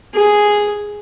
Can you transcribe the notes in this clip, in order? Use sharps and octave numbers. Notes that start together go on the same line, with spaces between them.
G#4